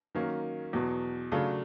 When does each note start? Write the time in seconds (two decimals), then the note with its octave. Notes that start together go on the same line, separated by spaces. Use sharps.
0.15 D#3 F#3 A#3 C#4
0.73 E2 B2 F#3
1.32 C#3 F#3 A3 D4 F4